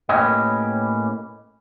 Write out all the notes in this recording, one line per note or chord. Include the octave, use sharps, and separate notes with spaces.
A2 A#3 C#4 G4 B4 D#5